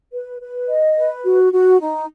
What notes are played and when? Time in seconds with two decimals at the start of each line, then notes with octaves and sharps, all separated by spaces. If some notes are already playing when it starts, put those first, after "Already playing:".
0.13 B4
0.40 B4
0.68 D#5
0.96 B4
1.24 F#4
1.53 F#4
1.81 D#4